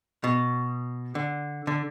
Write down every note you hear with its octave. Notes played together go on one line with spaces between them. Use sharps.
B2
D3
D3